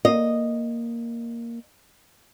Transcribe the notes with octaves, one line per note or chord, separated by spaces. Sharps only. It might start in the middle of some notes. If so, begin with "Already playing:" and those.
A#3 D#5